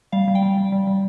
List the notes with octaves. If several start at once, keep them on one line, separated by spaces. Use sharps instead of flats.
G3 F5
G3
G5
G3
G3
G3
G3